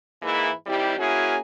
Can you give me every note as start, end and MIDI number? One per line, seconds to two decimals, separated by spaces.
0.22 0.50 44
0.22 0.50 52
0.22 0.50 56
0.22 0.50 58
0.22 0.50 64
0.66 0.96 51
0.66 0.96 55
0.66 0.96 60
0.66 0.96 64
0.66 0.96 67
0.99 1.38 58
0.99 1.38 61
0.99 1.38 64
0.99 1.38 66
0.99 1.38 68